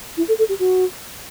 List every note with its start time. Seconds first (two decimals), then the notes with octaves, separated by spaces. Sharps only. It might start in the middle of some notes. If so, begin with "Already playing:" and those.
0.17 E4
0.28 A4
0.38 A4
0.49 G4
0.59 F#4